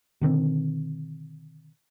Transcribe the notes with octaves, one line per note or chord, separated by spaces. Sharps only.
B2 D3 D#3 C4